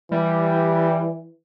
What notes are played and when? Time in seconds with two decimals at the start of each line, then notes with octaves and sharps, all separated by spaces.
0.11 E3 G3